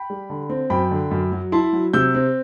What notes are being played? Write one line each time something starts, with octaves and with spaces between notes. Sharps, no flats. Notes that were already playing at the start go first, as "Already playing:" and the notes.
Already playing: G5 B5
G3
D3
C4
F#2 G5 B5
D3
F#2
F#3
E4 A5 C6
F#3
C3 E6 G6
C4